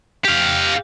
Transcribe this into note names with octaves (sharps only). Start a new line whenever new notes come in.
G4 F5